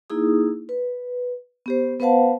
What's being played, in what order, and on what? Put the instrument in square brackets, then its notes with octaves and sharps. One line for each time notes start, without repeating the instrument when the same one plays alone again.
[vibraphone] A#3 D#4 E4 G#4 D#6
B4
B3 G4 C5
B3 B4 C5 F5 F#5 A5